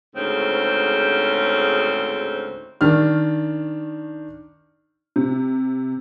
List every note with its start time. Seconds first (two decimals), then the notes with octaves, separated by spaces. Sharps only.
0.15 D2 G#2 C#3 C4
2.81 D#3 D4 F6
5.16 C3